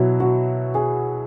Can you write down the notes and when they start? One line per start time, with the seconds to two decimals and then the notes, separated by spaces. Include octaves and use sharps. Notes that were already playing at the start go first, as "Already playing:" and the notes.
Already playing: B2 F#3 E4
0.20 F#4
0.75 G#4